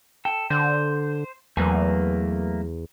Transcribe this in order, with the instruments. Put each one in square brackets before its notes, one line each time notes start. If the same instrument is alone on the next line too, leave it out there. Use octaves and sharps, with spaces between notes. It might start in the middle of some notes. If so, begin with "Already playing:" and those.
[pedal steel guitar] A4 [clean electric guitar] G5
[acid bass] D3 [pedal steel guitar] C5
[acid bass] E2 [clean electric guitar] F#3 B4 G#5 [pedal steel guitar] A3 A#3